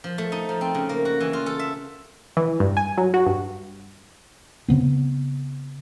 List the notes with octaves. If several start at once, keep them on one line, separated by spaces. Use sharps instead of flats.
F3
A3
D#4
F3
C4
C#3
A#3
F#4
E3
F4
A4
E5
E3
G2
G#5
F#3
F#4
G2
C#3 B3 C4